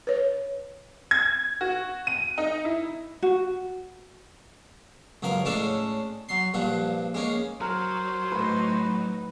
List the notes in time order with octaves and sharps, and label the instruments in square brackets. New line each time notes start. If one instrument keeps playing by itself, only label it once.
[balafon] B4 C#5
[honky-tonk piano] G#6
F#4
D#7
D#4
E4
[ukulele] F#4
[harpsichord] C#2 F#2 F3 A#4 A#5
A2 G#3 A3 C#4 D4 A4
F#3 C6
A#1 G2 F3 F#5
G#3 A#3 C#4
[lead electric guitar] F#3 [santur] A#4 E6 [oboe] C5
[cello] A2 D#4 [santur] B4 G5